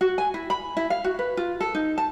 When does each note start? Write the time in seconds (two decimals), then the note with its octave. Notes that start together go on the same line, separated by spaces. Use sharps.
0.01 F#4
0.18 G#5
0.34 E4
0.50 B5
0.77 E4
0.90 F5
1.04 F#4
1.19 B4
1.37 F4
1.61 A4
1.75 D#4
1.98 A5